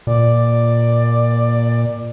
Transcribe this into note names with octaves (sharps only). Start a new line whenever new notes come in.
A#2 D5